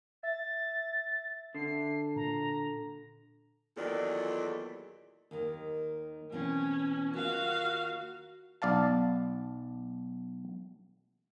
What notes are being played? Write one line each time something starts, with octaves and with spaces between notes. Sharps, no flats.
E5 A6
D3 C7
A#2 A#5
E2 A#2 D#3 F#3 A4 D5
D#2 D#3
B2 E3 C4 C#4
D#2 F4 F#4 F5
B1 D5 F5 A5